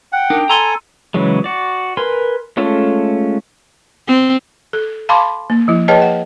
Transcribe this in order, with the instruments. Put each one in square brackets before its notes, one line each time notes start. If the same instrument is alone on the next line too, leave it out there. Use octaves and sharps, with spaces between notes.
[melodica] F#5 [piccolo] G5
[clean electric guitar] D4 D#4 A#4
[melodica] A4 G#5 [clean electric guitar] A#5 C6
[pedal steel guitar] C#3 E3 F#3 G#3
F#4 D5
A#4 B4 G#5 C6
G#3 A3 C#4 F4 A4
[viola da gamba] C4
[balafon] A4
F5 A5 B5 C6 D6
A#3
F3 E4
G#4 B4 C#5 D#5 G5 A5
F#5